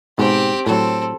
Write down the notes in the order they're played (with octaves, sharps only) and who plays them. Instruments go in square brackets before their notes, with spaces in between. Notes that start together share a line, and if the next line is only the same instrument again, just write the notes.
[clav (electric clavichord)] G#2 B2 [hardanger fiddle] C4 G4
[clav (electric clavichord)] A2 F#3 [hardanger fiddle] C4 A4